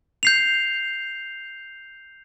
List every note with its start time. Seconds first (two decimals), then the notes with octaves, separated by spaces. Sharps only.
0.23 G6 C7 F7